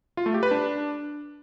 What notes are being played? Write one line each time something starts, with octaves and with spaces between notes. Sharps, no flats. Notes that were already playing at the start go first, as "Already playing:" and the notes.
F4
A3
G4
B4
D4